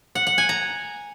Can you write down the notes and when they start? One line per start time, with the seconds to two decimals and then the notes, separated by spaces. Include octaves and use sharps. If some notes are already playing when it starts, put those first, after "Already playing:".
0.15 F#5
0.27 F#5
0.38 G#5
0.49 A#5